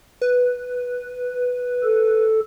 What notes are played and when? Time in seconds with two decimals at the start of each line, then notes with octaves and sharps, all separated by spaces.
0.21 B4
1.83 A4